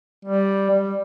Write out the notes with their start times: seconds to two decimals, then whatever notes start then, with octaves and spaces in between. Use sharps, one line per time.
0.25 G3
0.70 G3